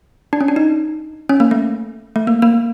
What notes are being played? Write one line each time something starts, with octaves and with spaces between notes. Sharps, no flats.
D4
C#4
D4
D#4
C#4
A#3
A3
A3
A#3
A#3